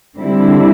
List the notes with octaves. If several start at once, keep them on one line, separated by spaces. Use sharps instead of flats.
D3 G3 C4 E4